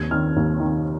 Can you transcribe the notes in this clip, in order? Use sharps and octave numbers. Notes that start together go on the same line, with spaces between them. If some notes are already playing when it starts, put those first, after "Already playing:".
Already playing: D#2 G#6
D#3 F6
D#2
D#3